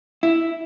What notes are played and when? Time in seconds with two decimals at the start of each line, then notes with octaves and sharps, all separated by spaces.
0.23 E4